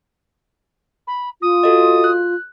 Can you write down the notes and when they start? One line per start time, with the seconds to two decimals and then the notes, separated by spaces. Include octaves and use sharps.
1.07 B5
1.42 F4 D#6
1.63 F#4 A4 D#5
2.04 F#6